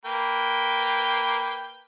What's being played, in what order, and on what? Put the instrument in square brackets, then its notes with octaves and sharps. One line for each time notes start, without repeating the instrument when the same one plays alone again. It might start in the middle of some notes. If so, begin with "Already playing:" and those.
[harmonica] A#3 B4 G5